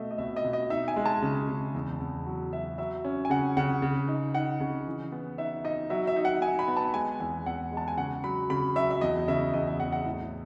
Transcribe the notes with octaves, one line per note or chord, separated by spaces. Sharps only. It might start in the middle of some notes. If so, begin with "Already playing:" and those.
Already playing: B2 A3 D#5 E5
D#5
B2 E5
D#5
B2
D#5
D#4 E5
G#5
G#3
A5
C#3
C#3
E2
E2
F#3
F#3 E5
F#3 E5
C#4
G#5
C#3 F#5
C#3 F#5
C#3
D#4
D#4 F#5
C#3
E3
B3
D#4 E5
D#4 D#5
F#3 E5
E5
D#4
F#5
D#4 G#5
B5
B3
A5
G#3 G#5
E2 G#5
E2 F#5
G#3 A5
G#5
C#3 F#5
F#3 B5
C#3 B5
F#3 E5
E5
E2 D#5
C#3 E5
E2 D#5
E5
E2 F#5
F#5
A2